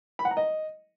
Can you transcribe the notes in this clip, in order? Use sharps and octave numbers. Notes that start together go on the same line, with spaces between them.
B5
F#5
A#5
D#5